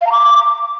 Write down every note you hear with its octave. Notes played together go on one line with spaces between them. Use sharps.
F5
A#5
D6